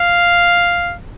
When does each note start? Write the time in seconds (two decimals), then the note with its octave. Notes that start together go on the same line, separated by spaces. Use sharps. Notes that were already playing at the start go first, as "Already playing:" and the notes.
Already playing: F5